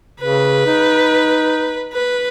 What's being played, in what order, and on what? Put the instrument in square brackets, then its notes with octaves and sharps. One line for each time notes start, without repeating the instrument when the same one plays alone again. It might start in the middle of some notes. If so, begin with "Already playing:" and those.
[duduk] C#3 [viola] B4
[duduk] D#4
[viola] B4